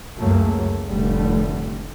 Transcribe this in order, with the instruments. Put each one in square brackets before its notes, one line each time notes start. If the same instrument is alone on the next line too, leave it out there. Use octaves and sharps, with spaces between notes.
[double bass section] C#2 F#2 C#3 F#3 A3 A#3
F1 A2 D3 G3 A3